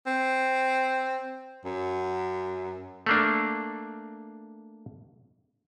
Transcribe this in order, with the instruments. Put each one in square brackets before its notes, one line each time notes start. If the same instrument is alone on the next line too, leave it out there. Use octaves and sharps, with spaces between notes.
[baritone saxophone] C4
F#2
[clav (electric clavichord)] A3 A#3 D4